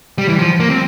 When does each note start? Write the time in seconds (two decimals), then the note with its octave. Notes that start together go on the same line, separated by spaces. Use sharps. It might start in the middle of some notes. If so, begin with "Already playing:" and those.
0.18 G3
0.29 E3
0.39 F3
0.60 A#3
0.70 C4